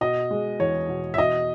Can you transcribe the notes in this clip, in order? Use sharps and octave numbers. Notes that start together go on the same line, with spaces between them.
B2 D#5
G#3
E2 C#5
B2
E5
B2 D#5